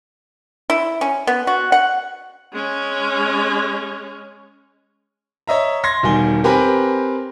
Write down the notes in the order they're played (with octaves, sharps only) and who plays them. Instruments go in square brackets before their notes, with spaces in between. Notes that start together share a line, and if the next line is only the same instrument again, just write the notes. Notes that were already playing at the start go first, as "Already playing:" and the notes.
[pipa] E4
C#4
B3
F#4
F#5
[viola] G#3 C#4
[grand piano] C#5 D#5 E5 A#5
C6 G#6 A#6
E1 D#3 G3 G#5 G7
C4 G4 A#4 B4 G#5 B5